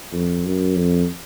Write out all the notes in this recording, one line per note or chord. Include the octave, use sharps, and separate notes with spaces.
F2
F#2
F2